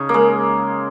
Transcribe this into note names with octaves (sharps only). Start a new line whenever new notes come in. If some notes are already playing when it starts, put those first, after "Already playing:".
Already playing: C#3 C#4 D#4
G#3 A#3